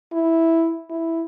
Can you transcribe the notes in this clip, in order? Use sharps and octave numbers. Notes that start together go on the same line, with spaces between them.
E4
E4